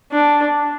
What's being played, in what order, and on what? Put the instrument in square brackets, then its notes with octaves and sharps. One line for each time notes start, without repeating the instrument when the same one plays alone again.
[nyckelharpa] D4